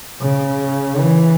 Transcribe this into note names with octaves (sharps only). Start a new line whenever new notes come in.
C#3
E3